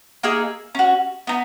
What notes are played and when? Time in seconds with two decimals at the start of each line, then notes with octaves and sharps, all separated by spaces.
0.23 A#3 D#4 G#4 E6
0.75 C#4 F#4
1.27 B3 D#4